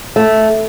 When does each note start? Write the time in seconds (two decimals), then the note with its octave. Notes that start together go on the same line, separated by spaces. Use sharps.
0.16 A3